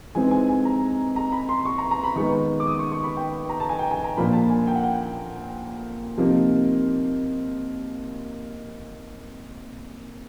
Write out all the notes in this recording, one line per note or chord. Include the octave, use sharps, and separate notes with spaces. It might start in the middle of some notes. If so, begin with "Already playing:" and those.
E3 G#3 C4 D#4 G#5
G#5
G#5
A#5
A#5
B5
C6
C#6
A#5
A#5
B5
D#3 G#3 B3 D#4 C#6
D6
D#6
C#6
C#6
B5
G5
A#5
A5
G#5
G5
G#5
A#5
A#2 F3 A#3 D4 B5
A5
G#5
G5
F#5
G5
C3 F3 A#3 D#4